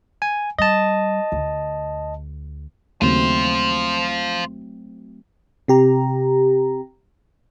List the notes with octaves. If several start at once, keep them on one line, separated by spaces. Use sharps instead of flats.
G#5
G3 D#5 A5
D2
D#2 C#3 F#3 A3 C4 F4 C5
C3 G4 A#5